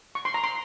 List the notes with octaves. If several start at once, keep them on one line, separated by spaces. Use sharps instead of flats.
C#6
C6
A#5
C6